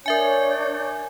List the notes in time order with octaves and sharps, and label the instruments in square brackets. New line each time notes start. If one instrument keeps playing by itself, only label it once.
[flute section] D4 C#5 G6 [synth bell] A#4 E5 G#5